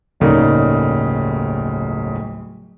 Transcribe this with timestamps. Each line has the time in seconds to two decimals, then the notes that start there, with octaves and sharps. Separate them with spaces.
0.20 D1 G1 C#3 A#3 D#4 D5